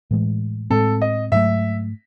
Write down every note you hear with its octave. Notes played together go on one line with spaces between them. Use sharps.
A2 E3 G#3
A2 G#3 C4 A4
D#5
G#2 F#3 A3 E5